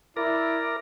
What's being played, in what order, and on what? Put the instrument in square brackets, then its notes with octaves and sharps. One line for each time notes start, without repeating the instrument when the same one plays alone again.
[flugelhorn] E4 [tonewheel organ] A#4 [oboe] D5